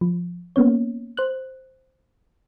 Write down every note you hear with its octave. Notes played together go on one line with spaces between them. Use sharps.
F3
A#3 B3 C#4 C#5
C5 F#6